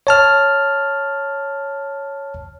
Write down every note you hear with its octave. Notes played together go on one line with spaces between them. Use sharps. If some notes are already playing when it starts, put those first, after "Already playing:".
C#5 A5 F6